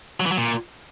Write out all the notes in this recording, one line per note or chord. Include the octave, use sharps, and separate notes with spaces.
F#3
E3
F#3
A#2